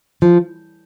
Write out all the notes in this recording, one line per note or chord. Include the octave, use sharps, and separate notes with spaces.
F3